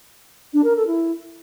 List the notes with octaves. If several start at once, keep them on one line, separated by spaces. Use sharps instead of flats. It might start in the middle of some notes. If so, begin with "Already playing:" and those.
D4
A#4
A4
E4